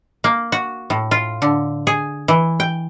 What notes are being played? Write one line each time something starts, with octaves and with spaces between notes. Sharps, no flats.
A#3
F#4
A2
F4
D3
G#4
E3
G5